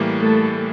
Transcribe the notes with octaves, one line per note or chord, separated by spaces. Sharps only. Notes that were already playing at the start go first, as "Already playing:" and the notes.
Already playing: A2 E3 G3 A#3
A3 A4